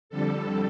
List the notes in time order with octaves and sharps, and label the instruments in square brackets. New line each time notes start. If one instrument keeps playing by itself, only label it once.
[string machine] F2 D3 G3 A4